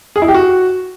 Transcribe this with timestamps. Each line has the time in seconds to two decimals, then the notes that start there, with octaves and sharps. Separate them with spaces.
0.16 G#4
0.22 E4
0.28 G4
0.34 F#4